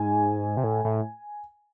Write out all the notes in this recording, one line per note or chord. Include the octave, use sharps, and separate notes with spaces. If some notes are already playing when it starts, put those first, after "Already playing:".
Already playing: G#2 G#5
C3
A2
A2